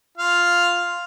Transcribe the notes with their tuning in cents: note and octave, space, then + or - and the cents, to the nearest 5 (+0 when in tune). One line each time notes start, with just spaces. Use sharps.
F4 +0 F5 +0